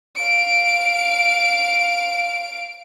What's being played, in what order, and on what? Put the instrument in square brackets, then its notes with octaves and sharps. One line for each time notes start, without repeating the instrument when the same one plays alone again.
[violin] F5 D7